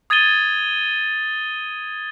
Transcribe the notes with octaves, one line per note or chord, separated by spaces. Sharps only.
D#6 G#6 A6 D#7 G7